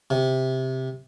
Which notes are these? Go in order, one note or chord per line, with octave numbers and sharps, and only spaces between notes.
C3